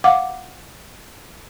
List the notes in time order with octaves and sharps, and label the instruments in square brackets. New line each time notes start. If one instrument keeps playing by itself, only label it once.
[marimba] F5 F#5 D6